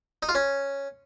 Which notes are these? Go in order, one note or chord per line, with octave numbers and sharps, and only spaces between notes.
D#4
F4
C#4